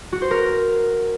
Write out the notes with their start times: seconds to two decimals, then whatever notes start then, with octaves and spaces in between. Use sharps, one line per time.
0.12 F#4
0.22 C5
0.31 A#4